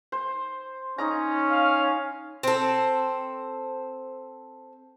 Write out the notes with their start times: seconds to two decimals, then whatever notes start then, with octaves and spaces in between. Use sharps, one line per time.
0.12 C5
0.98 C#4 D#4 D#5 A#5
1.51 F5
2.43 C4 A4